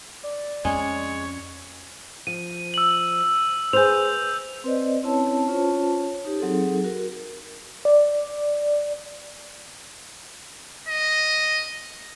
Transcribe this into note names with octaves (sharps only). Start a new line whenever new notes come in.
D5
F2 G#3 B3 C#4 C#5
F3 D#7
E6 F#7
G#4 B4 C5 G6 F7
C4 B4 C5 D5 D#5
C4 C#4 E4 C#5 A5
C#4 F4 C5 C#5 A5
D#4 G4
F#3 C4 D#4 G#4 A4
F#4 A#4
D5
D#5